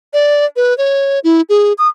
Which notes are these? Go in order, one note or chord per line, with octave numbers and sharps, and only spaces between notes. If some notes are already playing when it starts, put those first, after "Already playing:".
D5
B4
C#5
E4
G#4
D#6